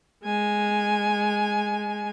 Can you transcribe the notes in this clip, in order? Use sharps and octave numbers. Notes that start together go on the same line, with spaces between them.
G#3 G#5